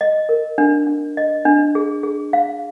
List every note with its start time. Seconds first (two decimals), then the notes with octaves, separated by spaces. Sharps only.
0.01 D#5
0.29 A#4
0.58 D4
0.87 D4
1.17 D#5
1.45 D4
1.75 G#4
2.03 G#4
2.33 F5